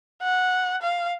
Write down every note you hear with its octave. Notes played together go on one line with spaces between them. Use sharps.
F#5
F5